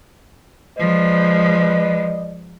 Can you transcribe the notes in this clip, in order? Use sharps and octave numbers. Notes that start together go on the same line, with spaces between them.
F3 G#3 B4 D5 D#5